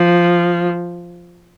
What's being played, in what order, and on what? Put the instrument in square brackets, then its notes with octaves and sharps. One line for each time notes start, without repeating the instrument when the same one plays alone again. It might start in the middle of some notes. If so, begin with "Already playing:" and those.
Already playing: [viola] F3